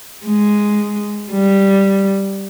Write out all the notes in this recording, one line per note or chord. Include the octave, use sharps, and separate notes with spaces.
G#3
G3